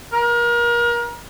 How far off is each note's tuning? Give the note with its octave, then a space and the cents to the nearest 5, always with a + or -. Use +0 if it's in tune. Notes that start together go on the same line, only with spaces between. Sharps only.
A#4 +30